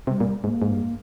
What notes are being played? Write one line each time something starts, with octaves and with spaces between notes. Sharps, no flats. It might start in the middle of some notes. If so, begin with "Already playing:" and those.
C3 G3
A#2
G#2 A#3
G#2
G2